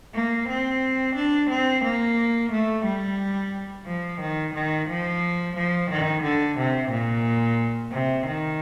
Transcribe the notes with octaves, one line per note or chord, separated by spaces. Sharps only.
A#3
C4
D4
C4
A#3
A3
G3
F3
D#3
D#3
F3
F3
D#3
D3
C3
A#2
C3
D#3